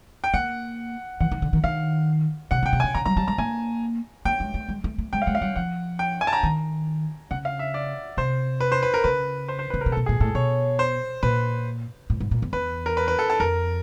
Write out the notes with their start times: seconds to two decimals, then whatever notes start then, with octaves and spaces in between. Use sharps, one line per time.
0.24 G5
0.34 A#3 F#5
1.20 E3 F#5
1.31 D#3
1.42 D3
1.53 D#3
1.64 D#3 F5
2.51 C3 F#5
2.63 C#3
2.66 G5
2.73 C3
2.80 G#5
2.84 C#3
2.95 C#3 A#5
3.06 G3 A#5
3.17 G3 A5
3.28 G#3 A#5
3.38 A#3 G#5
4.25 A#3 G5
4.40 G#3
4.54 A3
4.69 G#3
4.84 A3
4.98 A3
5.13 G#3 G5
5.22 F5
5.27 G#3 F#5
5.35 F5
5.41 G3 F#5
5.56 F3 F#5
5.99 G5
6.21 G#5
6.27 A5
6.33 A#5
6.43 D#3
7.31 C#3 F#5
7.45 F5
7.59 E5
7.74 D5
8.17 C3 C5
8.60 B4
8.72 C5
8.83 B4
8.94 A#4
9.04 C#3 B4
9.48 C5
9.59 C5
9.70 B4
9.74 C#3
9.81 A#4
9.86 C3
9.92 A4
9.97 B2
10.06 G#4
10.09 A#2
10.20 A2 A4
10.35 B2 C#5
10.79 C5
11.23 A#2 B4
12.10 A2
12.20 G#2
12.31 A#2
12.42 E2
12.53 E2 B4
12.86 A#4
12.97 B4
13.08 B4
13.19 A4
13.30 A4
13.40 F2 A#4